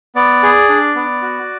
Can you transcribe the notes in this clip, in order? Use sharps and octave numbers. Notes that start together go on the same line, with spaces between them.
B3 D5
G#4
D4
B3
F#4